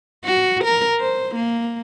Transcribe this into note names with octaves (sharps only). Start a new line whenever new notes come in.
F#4
A#4
C5
A#3